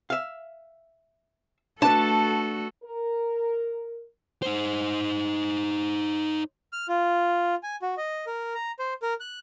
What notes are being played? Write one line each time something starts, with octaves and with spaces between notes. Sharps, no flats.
E5 F5
A3 D4 F#4 A4 B4 A5
A#4
D#4 C5
F6
F4
G#5
F#4
D#5
A#4
A#5
C5
A#4
F#6